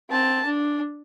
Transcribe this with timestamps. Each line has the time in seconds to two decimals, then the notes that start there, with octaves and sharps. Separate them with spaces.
0.10 C4 A5
0.46 D4